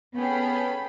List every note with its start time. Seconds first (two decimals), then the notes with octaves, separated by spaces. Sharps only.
0.16 B3 C#4 G#4 A4 G5 B5